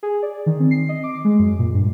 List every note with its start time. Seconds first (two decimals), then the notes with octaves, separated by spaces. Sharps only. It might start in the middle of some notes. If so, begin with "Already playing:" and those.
0.03 G#4
0.23 D5
0.46 D#3
0.60 C4
0.71 C7
0.89 D#5
1.04 D6
1.25 G#3
1.39 F#2
1.59 A#2
1.74 G2